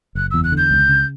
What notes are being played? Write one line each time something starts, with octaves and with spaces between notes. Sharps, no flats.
F#1 F#6
E2 E6
F#6
D3 G6
C#2
C#3